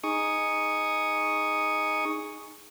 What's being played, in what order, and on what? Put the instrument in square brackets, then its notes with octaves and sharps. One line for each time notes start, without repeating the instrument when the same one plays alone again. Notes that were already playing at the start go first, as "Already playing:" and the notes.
[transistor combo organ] D#4 G#4 C#6 D#6